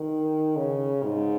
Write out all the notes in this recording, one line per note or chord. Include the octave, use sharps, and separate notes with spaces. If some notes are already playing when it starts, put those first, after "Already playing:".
Already playing: D#3
C#3
G#2